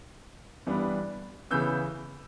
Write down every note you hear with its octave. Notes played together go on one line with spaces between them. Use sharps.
G2 E3 G3 B3 D4
C#3 E3 B3 E6 G6